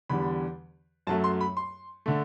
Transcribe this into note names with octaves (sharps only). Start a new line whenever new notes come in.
E2 D3 G3 B5
F#2 F#3 A3 A5
C6
B5
C6
D3 A3